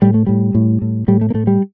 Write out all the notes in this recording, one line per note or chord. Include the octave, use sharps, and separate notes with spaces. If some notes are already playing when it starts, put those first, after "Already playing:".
A2 G3
A3
A2 G3
A2
A2
A2 G3
A3
A#3
A2 A3
G3